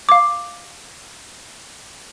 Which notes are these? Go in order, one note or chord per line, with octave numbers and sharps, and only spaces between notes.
F5 D6